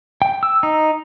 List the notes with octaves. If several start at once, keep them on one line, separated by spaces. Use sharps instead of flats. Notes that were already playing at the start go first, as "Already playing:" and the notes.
G5
E6
D#4